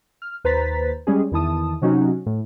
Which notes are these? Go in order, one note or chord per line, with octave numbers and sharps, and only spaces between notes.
F6
D#2 B4 C5 A#5 A6 B6
G3 G#3 C#4 G#4
E2 D#3 E4 A5 D#6
C3 F#3 C#4 D#4 F#4
A2